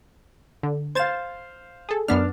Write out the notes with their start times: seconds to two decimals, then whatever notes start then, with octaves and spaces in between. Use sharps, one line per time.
0.63 D3
0.95 C5 F5 G#6 A6 E7
1.89 G#4 A4
2.08 F#2 B3 D4 F6